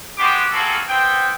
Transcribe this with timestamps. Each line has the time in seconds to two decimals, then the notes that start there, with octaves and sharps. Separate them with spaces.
0.18 G#3 B3 F#4 G4 C5 D6
0.52 A#3 C4 F4 F#4 G#4 A4
0.89 B3 C4 G5